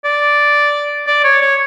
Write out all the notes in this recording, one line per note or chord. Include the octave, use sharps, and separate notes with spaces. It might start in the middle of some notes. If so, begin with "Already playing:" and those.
D5
D5
C#5
C#5